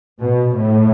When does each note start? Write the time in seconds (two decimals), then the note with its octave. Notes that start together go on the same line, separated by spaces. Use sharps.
0.21 B2
0.55 A2